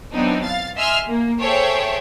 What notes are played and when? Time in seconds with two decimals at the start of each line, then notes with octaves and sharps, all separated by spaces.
0.13 E3 F#3 B3 C4 D4 D#4
0.44 F5 A6
0.77 D#5 E5 G#5 C6 E6 F6
1.06 A#3
1.41 G#4 A4 C5 C#5 E5 G5